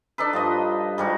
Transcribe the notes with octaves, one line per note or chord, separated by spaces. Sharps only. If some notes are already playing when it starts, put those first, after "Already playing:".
D4 D#4 A4 B4
G2 F3 D#5
G#2 G3 F#4